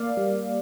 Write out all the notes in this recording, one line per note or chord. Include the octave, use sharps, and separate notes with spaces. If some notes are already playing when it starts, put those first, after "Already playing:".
Already playing: A#3 D5 F5
G3